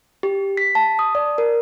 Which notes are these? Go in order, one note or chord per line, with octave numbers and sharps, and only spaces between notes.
G4
B6
A5
D#6
D5
A#4